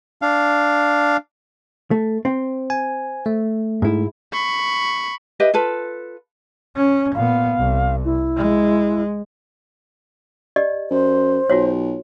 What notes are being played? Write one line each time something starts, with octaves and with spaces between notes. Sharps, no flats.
D4 F5
A3
C4
G#5
A3
G#2 E4
B5 C#6
G4 B4 D#5 E5
F4 A4 B4
C#4
A#2 B3 F5
C2
E4
G#3
G4 D5 D#5
F#2 C5
B1 F4 F#4 C#5